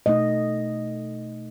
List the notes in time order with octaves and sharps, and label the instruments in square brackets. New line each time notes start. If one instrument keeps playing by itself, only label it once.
[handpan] B2 A3 D#4 D#5